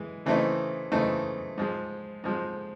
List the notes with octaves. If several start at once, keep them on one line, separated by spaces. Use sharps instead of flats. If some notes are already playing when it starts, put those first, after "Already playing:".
Already playing: E3 G#3
C#3 E3 A3 C4 D#4
C#3 E3 A3 C4 D#4
G#2 F3 G#3
G#2 F3 G#3